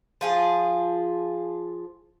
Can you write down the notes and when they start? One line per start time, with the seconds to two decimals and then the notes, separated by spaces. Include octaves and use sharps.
0.21 F3 F4 G#4